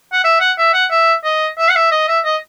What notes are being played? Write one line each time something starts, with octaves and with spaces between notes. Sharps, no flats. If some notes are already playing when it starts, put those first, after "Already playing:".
F#5
E5
F#5
E5
F#5
E5
D#5
E5
F#5
E5
D#5
E5
D#5